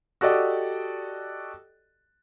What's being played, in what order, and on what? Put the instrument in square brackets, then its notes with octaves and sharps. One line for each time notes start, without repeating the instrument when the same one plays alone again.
[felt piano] F#4 G4 A4 D5 D#5